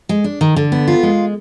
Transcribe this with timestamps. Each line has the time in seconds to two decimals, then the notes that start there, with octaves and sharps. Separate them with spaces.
0.09 G#3
0.24 D4
0.41 D#3
0.56 D3
0.72 B3
0.88 F4
1.03 G#3